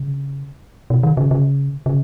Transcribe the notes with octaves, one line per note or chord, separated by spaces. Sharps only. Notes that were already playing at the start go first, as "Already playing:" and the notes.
Already playing: C#3
B2
D#3
C#3
C#3
C#3